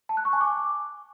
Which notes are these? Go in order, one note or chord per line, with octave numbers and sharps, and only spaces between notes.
A5
F#6
C#6
G#5
D6